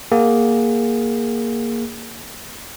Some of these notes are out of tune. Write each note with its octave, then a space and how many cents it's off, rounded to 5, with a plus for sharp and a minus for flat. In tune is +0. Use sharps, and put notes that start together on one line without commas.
A#3 +0 G#4 +0 F#5 +15